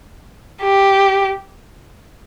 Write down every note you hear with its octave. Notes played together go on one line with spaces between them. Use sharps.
G4